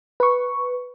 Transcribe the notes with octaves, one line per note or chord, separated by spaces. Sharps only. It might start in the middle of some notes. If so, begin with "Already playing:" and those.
B4 C#6